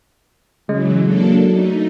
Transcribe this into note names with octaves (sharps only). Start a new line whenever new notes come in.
C#3 E3 F#3 G#3
F#3 A#3 D4 A4
A3 D#4